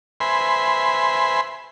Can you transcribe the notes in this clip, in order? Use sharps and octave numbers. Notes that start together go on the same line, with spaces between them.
B4 C5 E5 G#5 B5 C6